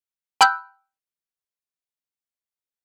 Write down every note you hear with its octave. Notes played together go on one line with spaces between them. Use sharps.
G5 B5 E6 F#6 G6